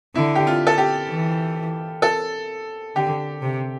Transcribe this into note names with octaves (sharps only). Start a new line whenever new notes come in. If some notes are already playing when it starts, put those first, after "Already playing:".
D3 E4
G4
F4
A4
G4
E3
A4
D3 G4
C3